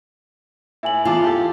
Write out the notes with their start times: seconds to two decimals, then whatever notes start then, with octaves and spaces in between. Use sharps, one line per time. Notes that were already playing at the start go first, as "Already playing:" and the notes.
0.83 A2 E5 G#5 F#7
1.05 E2 F4 A5 D6
1.24 G4 A4